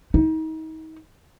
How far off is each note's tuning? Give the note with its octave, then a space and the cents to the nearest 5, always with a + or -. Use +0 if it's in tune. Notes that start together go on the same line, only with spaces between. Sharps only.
D#4 +35